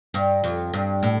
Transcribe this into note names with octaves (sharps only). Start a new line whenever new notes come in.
G2
F2
G2
A2